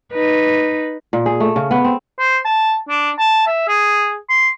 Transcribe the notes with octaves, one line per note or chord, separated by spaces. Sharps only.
D#4 B4
A#2
G#4
A3
C#3
B3
C4
C5
A5
D4
A5
E5
G#4
C6